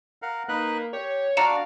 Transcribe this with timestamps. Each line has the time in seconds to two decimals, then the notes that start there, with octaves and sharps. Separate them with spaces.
0.22 A#4 F5 F#5
0.48 A#3 D#4 B4 F#6
0.93 G4 C#5
1.37 D4 F#4 D5 F5 A#5 C#7 E7